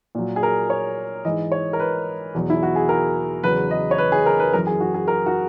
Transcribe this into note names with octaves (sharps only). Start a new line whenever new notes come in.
A#2 F#3
G#4
A#4
C#5
G#2 E3 D#5
C#5
A#4
B4
E2 B2 F#3
E4
F#4
G#4
A#4
E2 C#3 F#3 B4
D#5
C#5
B4
G#4
A#4
B4
F#2 E3 A#4
G#4
F#4
G#4
A#4
F#4